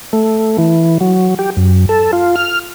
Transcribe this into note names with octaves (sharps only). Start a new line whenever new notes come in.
A3
E3
F#3
G4
F#2
A4
F4
F6